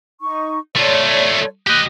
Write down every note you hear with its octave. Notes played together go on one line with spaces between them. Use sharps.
D#4 C#6
A3 F4 C#5 D5
G4 D#5 F#6 G6